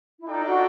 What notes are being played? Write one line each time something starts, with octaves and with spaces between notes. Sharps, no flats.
E4
D4 D#4 F4 A4 D5 G5
F#4